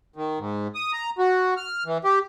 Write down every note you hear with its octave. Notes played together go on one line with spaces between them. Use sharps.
D#3
G#2
D#6
A#5
F#4
F6
E3
G4